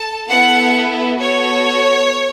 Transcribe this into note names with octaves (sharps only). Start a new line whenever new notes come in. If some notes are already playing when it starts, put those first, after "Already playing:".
Already playing: A4 A5
B3 E4 A4 F#5
B3 F#4 A4 C#5